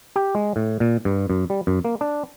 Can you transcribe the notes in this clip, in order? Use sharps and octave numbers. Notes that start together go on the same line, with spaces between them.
G4
G#3
A2
A#2
G2
F#2
G3
F#2
A#3
D4